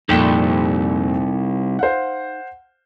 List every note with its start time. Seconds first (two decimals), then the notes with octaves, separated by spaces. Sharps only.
0.09 C2 F2 A#2 D#4 A4 G5 E7
1.79 C5 F5 F#5